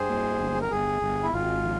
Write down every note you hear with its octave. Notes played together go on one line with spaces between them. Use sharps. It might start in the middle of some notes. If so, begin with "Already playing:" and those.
Already playing: G2 G#4 C5
A#3
G1
A#4
G1 G#4
G1
E4
G#1 F4
F3